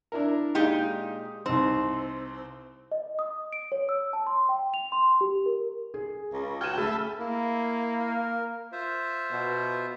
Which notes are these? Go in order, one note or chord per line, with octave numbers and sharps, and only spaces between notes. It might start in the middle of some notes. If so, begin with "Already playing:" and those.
D4 E4 A#4
A#2 G#3 D#4 G4 F5
C2 C4 D#4
D#5
D#6
D7
C#5
E6
A5
C6
G5
F7
C6
G4
A#4
G#4
C#2
F#4 G5 F6 G#6 D#7 E7
A3 G#4 E5 A5 B5
A#3 E4
A#4
F4 C5 E5
B2